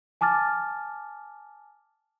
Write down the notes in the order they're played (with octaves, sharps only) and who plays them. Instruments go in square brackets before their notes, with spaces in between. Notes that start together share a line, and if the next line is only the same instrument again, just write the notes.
[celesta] G#5 A5 D6 F6 A6